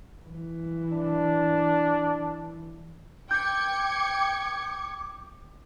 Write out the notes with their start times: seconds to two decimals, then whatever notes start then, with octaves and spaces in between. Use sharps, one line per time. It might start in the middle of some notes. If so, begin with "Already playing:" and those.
0.24 E3
0.92 D4
3.31 G5 D6 G6 G#6 C#7